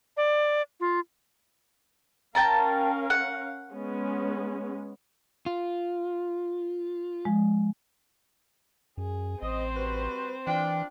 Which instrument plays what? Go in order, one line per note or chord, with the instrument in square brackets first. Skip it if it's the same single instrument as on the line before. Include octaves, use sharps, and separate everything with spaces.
[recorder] D5
F4
[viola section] C#4 A#4 F5 [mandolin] G5 A5 A#5
[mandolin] F#5
[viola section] G#3 B3 C#4
[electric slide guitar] F4
[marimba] F3 G#3
[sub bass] F#2 [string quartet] G#4
[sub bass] A1 [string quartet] C4 C5 [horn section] D#5
[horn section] G3 F#4 B4
[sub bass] E3 [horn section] D4 F4 [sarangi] G5